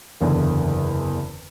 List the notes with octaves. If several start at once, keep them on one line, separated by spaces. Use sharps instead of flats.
F#1 E2 D3